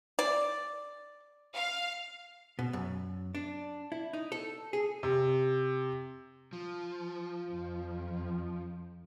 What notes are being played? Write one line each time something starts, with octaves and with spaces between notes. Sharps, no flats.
D5
F5
B2
F#2
D4
E4
D#4
A4
G#4
C3
F3
F2